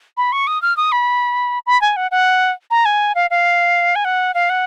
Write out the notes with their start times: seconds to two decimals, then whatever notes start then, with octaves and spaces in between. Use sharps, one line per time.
0.17 B5
0.32 C#6
0.47 D#6
0.62 F6
0.77 D#6
0.92 B5
1.66 B5
1.82 G#5
1.96 F#5
2.11 F#5
2.71 A#5
2.85 G#5
3.15 F5
3.30 F5
3.95 G#5
4.05 F#5
4.34 F5
4.50 F#5